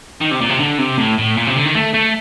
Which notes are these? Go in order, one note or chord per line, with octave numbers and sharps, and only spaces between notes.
D#3
C3
A#2
C3
D3
C3
A2
A2
A#2
C3
D3
D#3
A3
A3